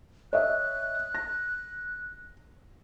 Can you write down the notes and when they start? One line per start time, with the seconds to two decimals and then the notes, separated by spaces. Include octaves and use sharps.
0.33 C#5 D#5 E5 F#6
1.15 A#6